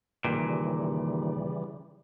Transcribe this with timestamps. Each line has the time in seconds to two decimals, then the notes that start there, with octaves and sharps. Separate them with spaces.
0.25 D#2 A#2 C#3 E3 G3